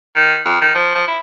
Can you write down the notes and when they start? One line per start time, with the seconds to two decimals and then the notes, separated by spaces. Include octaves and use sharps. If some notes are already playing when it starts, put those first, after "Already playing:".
0.16 D#3
0.45 F2
0.61 D#3
0.75 F3
0.95 F3
1.07 E4